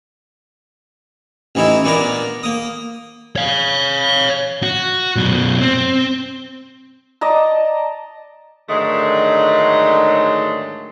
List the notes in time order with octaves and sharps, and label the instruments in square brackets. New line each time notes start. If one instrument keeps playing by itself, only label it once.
[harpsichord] A1 E3 D#4 E4
A#2 B3 D4 A#4 A#5
A#3 D#6
[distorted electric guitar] C#5 F5
F#4
F#2 B2
C4
[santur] D5 D#5 A5 A#5
[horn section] G#2 D3 D#3 F#3 G#3 A3